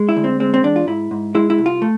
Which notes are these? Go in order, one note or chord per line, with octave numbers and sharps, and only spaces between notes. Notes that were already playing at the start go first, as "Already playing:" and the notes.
Already playing: G#3
E4
D2
C4
G#3 C4
C4
E2 D4
F4
G#2 E4
G#2
G#3 E4
E4
C2
F4
A3